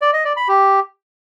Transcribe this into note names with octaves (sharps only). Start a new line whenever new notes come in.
D5
D#5
D5
B5
G4